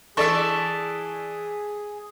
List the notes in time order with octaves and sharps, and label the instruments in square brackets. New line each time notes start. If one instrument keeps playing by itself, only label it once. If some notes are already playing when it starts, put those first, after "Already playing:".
[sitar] E3 D5 E5 [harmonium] G#4 [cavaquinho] A4 C#6